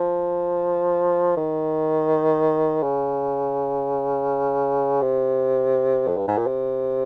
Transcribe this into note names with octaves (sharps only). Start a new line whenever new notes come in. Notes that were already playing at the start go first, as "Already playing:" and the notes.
Already playing: F3
D#3
C#3
C3
F2
G2
G#2
A#2
C3